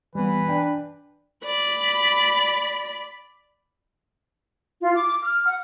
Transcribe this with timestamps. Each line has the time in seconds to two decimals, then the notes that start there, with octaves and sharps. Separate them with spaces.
0.15 E3 G3 B3 B4
0.49 D4 G5
1.44 D5 B5
4.82 F4
4.95 D6
5.23 F6
5.46 F#5